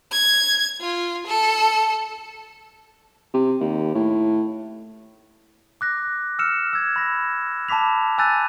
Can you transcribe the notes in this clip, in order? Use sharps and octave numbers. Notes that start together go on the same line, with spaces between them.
G#6
F4
A4
C3
D#2
A2
D6 F#6 A#6
E6 F6 C#7 E7
E6 G#6
B5 A#6
A5 B5 D6 B6 F7
G#5 E6 F#6 G6 A6 D#7